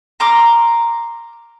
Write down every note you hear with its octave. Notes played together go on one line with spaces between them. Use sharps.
A#5 C6 D6 F6